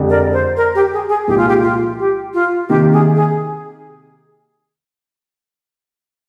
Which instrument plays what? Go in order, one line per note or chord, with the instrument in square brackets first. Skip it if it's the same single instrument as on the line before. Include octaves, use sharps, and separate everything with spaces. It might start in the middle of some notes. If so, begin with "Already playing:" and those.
Already playing: [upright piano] F2 D3 G#3 D4 G4
[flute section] A#4 D5
C5
A#4
G4
G#4
G#4
[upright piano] C2 A#2 F3 G#3 D#4 [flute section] G4
[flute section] F4
G4
F4
G4
F4
[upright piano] C3 D#3 A#3 [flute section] G4
[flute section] G#4
G#4